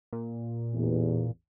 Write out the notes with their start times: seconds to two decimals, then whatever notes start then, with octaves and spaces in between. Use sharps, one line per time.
0.13 A#2
0.74 A1 E2